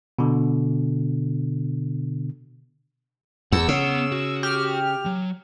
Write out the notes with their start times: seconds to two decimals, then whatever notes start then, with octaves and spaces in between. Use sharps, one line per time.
0.19 B2 D3
3.52 E2 F#5 E6
3.68 C#3 B3 F#5
4.12 F#4
4.43 G4 F6
5.06 F#3